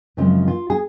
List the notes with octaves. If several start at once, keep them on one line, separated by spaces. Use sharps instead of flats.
F#2 C#3 F3 G#3 C4 F4
F4
G#4